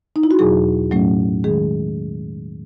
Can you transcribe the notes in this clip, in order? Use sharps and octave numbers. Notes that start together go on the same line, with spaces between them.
D#4
E4
F#4
E2 B2 F#3 G#4
A2 F#3 A3 C#4
D#3 G#3 G#4